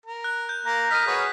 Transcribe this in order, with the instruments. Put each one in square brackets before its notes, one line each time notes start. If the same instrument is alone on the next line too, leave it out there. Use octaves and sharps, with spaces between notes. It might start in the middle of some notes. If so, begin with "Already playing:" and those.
[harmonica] A#4
[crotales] F#6
G6
[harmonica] A#3 [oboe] A#5
[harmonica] D#5 F6 [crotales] B6 D#7
[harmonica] F#4 B4 C#5 [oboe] G#4